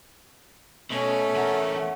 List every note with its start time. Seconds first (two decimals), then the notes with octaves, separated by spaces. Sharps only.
0.90 B2 A3 C#4
1.36 E2 A#4 F#5